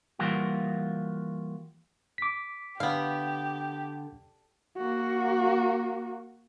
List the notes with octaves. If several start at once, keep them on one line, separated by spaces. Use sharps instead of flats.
E3 G3 A#3 F4 F#4
D6 B6
D3 B3 G4 F5
A#3 F#4